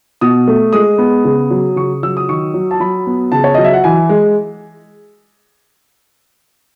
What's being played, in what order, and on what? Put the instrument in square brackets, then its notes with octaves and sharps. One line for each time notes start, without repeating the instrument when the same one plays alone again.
[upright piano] B2 D#6
A3
G#3 D#6
B3
C#3
F#3
C#3 C#6
F#3 E6
D#6
D#3 C#6
F#3
A5
F#3 B5
B3
C#3 A5
C#5
F#3 D#5
E5
F#5
E3 G#5
G#3